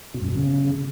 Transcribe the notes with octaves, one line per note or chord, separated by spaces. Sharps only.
B2
F#2
B2
C#3